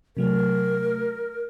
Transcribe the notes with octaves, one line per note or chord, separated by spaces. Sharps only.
C3 F#3 A3 A#4